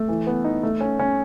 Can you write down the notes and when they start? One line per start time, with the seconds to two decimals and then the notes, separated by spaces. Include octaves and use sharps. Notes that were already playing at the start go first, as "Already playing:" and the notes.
Already playing: A3
0.08 E3
0.27 B3
0.44 D#4
0.63 A3
0.81 C#4
0.99 C#4